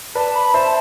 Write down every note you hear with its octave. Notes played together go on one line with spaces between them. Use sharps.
B4 D5 A5
B5
C5 E5 A5